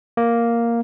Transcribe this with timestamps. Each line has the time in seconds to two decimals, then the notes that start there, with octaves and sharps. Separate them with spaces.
0.17 A#3